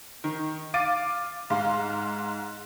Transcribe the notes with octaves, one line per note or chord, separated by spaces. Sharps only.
D#3
F5 D6 A6 D7 D#7
G#2 F5 C6